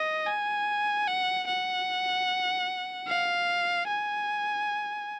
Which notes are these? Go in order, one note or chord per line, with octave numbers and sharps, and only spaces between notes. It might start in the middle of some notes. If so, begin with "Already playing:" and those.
Already playing: D#5
G#5
F#5
F#5
F5
G#5